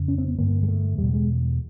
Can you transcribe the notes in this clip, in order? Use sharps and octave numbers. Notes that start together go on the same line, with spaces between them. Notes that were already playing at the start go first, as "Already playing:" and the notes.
Already playing: F2 C#3
C#4
C4
B3
G2 D3 A#3
G#3
A3
E2 B2 G3
G#3